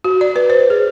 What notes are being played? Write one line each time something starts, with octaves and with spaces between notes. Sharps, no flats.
F#4
D5
B4
C5
G#4